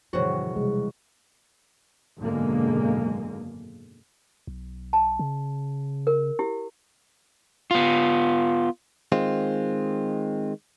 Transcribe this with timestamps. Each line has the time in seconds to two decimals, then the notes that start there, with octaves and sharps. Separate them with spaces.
0.13 E1 G2 D3 F3 F#4 C5 C#5
0.55 C3 G3 G#3
2.18 G#1 F#2 B2 D3 G#3 A#3
4.47 B1
4.93 A5
5.19 C#3
6.07 A#4
6.39 E4 G4
7.71 B3 F4
9.12 D#3 G#3 C4 F4